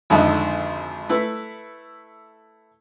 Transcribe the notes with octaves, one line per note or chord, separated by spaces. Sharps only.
G#1 F2 D3 D#4 E5
A3 E4 B4